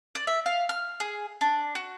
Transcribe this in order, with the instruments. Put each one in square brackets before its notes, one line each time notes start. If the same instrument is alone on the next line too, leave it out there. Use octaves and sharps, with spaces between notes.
[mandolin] D5
E5
F5
F6
G#4
D4
F#4